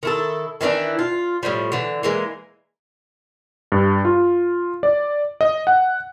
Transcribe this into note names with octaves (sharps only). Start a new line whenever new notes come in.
D#3 E4 A4
D#3 E3 D4 E4
F4
A2 C3 F3 G3
D3 E3
E3 G#3 A#3
G2
F4
D5
D#5
F#5